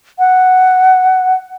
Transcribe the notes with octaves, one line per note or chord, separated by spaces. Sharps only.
F#5